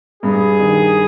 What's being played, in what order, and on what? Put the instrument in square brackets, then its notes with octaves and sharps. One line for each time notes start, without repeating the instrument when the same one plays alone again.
[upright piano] G2 [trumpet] G#4
[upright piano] D#3